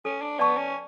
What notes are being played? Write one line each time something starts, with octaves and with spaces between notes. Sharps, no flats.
C#4 A4
D4
B3 D5 A5 C#6
C#4